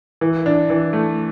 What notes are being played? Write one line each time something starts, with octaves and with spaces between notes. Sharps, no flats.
E3
D4
E3
A3